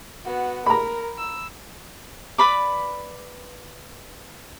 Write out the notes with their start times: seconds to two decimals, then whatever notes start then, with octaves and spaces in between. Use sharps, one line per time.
0.25 B3 F#4
0.66 A#4 A#5 B5
1.18 E6
2.38 B4 D5 B5 D6